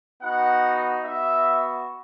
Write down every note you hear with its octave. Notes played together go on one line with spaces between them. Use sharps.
B3 D#4 F#4 F#5
B3 F#4 E5